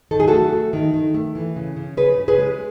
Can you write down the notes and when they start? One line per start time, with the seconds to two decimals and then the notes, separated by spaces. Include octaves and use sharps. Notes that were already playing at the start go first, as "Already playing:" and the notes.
0.11 D#3 A4
0.20 G#4
0.28 A3 F#4 A4
0.52 A3
0.73 D#3
0.94 D#3
1.14 A3
1.35 E3
1.56 C#3
1.76 C#3
1.97 C#3 G#4 B4
2.18 C#3
2.28 G#4 B4
2.38 G#3